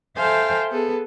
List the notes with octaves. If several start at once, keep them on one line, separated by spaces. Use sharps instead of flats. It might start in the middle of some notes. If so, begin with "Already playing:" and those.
A4 C5 E5 F5 G5 G#5
B3 G#4 A4 B4